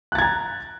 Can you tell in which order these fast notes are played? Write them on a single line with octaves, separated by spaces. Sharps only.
F#6 A6 G#6 A#5